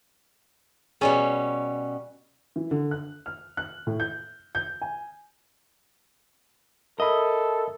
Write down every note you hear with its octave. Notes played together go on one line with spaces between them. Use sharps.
B2 G3 C#4 G#4 C#5 G#5
E3
D3
F#6
F6
F#6
A2
G6
G6
G#5
A4 A#4 D#5 E5 B5